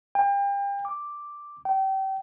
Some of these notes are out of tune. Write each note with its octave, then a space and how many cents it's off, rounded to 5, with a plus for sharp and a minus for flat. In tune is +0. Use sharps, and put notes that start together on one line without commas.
G5 +35
D6 +0
G5 -30